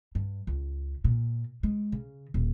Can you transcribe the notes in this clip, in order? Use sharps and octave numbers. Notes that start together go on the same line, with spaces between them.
G2
C#2
A#2
G#3
C#3
D#1